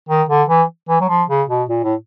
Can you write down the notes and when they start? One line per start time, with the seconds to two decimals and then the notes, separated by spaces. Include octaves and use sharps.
0.09 D#3
0.29 D3
0.49 E3
0.89 E3
1.01 F#3
1.09 F3
1.29 C#3
1.49 B2
1.69 A#2
1.84 A2